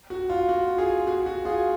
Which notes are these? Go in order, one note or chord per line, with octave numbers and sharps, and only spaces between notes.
F#4
F4
F#4
F4 G#4
F#4
F#4
F4 G#4